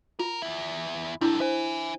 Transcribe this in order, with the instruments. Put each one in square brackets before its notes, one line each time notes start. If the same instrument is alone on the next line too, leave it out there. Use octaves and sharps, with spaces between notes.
[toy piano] F4 [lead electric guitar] A#4
[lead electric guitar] E2 E4
[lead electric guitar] G2 A4 [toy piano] D4 E4
[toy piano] C5 [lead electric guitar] E5 G#5